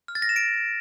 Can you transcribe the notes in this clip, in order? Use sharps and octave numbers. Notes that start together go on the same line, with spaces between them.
F6
A6
A#6
E7
D7